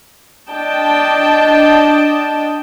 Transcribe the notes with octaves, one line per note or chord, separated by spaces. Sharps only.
D4 D#5 G5 A5